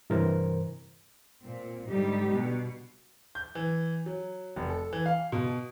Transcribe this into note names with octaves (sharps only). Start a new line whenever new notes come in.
G2 C3 E3 A#4 C5
A#2 C4
G#2 D3 G3 D#4 G4
B2
G6
E3
F#3
F1
A4
E3
F5
B2